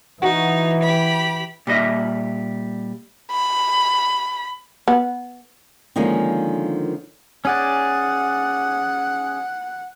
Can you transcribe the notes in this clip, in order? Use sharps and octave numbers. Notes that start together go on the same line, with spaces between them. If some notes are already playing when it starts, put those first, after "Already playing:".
E3 D#4 F#4
G4 B5
A#2 G3 D#5 E5
B5
B3
D3 D#3 F3 G#3 A#3 C#4
C#4 G#4 D5 F#5